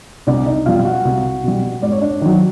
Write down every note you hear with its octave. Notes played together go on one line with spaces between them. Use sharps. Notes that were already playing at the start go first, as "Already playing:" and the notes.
C2 D4 D5
D#4 D#5
B2 G3 F4 F5
F5
F#4 F#5
C2
B2 G3
G#2 D5
C#5
D4 D5
D#3 F#3